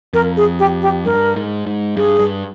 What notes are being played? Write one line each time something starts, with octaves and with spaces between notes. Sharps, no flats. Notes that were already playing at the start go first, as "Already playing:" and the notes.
F2 A#4
G#4
G4
G4
G2 A#4
G#2
G#2
G2 G#4
G2